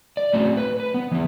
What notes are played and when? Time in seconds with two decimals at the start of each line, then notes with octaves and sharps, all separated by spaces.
0.17 D5
0.33 A3 C4 C#4 F#4
0.57 B4
0.80 B4
0.94 B3
1.11 E3 B3